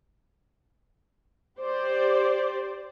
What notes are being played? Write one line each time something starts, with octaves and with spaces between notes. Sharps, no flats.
G4 C5 D5